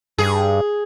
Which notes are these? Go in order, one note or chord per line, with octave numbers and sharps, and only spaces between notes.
G2 G#4